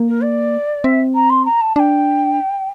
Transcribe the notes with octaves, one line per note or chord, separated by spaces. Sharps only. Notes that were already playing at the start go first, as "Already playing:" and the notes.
Already playing: A#3
A#4
D5
C4 E5
A#5
C6
A#5
A5
D4 G5 A5